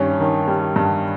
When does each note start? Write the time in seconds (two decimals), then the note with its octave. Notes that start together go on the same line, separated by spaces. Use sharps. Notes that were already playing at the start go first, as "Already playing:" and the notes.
Already playing: G2 D#3 G3 C#4
0.20 D#3
0.48 G3
0.76 G2